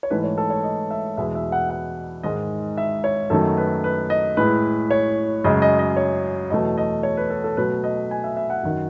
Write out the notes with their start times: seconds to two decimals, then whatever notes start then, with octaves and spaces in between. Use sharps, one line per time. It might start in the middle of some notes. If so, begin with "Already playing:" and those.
0.03 C#5
0.10 G#2 E3 A3 B4
0.24 C#5
0.38 A4
0.50 C#5
0.63 D#5
0.91 E5
1.17 E2 B2 G#3 E5
1.35 E5
1.52 F#5
1.70 F#5
2.23 G#2 D#3 G#3 D#5
2.78 E5
3.04 C#5
3.30 F#2 D#3 F#3 A3 A4
3.57 B4
3.84 B4
4.10 D#5
4.37 A2 G#3 B4
4.91 C#5
5.44 F#2 C#3 G#3 D#5
5.62 D#5
5.79 D#5
5.97 C#5
6.50 E2 B2 F#3 A3 D#5
6.78 D#5
7.03 C#5
7.17 B4
7.30 A4
7.44 A4
7.57 B2 F#3 A3 B4
7.84 D#5
8.11 G#5
8.24 E5
8.37 E5
8.50 F#5
8.63 F#2 D#3 F#3